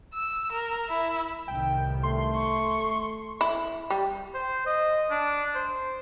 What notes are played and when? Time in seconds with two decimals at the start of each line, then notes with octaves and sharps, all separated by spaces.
0.14 E6
0.52 A#4
0.89 E4
1.48 C2 A2 D#3 G5
2.03 A3 C6
2.36 C#6
3.41 E4
3.90 G3
4.35 C5
4.66 D#5
5.11 D4
5.55 C5